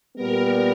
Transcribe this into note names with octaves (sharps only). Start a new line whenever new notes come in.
A#2 G3 B3 A#4